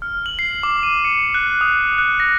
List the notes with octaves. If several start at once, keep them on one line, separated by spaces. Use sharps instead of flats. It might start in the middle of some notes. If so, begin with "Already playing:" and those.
F6
F#7
C7
D6
D#7
C#7
F#6
D#6
F#6
A#6